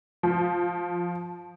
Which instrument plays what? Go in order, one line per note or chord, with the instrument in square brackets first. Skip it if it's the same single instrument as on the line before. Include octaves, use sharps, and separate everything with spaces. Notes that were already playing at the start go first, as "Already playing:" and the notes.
[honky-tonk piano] F3